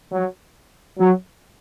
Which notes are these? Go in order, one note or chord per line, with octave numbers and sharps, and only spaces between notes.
F#3
F#3